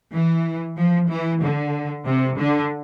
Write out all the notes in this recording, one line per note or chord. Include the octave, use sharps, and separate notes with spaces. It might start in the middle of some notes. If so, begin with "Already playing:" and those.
E3
F3
E3
D3
C3
D3